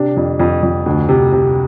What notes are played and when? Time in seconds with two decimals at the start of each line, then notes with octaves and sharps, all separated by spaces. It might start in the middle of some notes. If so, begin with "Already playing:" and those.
Already playing: C3 D4
0.17 F2
0.40 F2
0.63 F2
0.86 D2
1.09 C3
1.32 C3